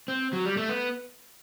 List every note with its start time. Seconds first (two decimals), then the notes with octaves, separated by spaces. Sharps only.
0.08 C4
0.33 F#3
0.46 G3
0.57 A3
0.69 B3